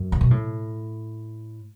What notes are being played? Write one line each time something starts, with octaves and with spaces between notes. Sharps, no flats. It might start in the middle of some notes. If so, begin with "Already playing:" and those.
Already playing: F#2
C#3
B2
A2